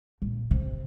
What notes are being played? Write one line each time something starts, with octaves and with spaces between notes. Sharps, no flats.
A#2
C3